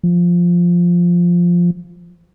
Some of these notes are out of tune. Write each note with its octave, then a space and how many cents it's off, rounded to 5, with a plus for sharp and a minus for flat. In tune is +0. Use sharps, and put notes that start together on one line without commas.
F3 +0